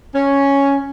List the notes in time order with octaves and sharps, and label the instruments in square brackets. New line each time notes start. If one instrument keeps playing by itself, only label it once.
[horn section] C#4